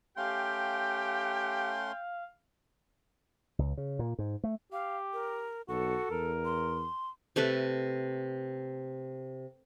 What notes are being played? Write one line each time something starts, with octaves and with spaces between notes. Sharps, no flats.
A3 C#4 G4 F5 G5 C6
C#2
C#3
A#2
G#2
A3
G4 F5
A#4
B1 F#4 A4
E2 A#4
C6
C3 A3 A4 B4